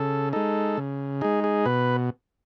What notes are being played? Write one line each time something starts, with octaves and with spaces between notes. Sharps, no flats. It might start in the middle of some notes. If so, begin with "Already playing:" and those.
Already playing: C#3 A4
G#3 D#4 A4
C#3
G#3 D#4 G#4
G#4
B2 B4